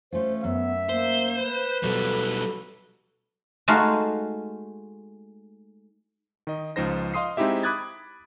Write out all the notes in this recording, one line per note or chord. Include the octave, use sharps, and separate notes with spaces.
A3 C#4 F4 C5
F#2 B3 E5
A#3 C5
B4
B2 F#3 G3 A4
G#3 A3 D#4 F#4 F5
D#3 D#5
C#2 F3 D#4 C5 A#6
D#5 F5 C6 D#6 C7
G#3 C4 D#4 E4 G4 E5
B5 D6 D#6 F#6 G#6 A6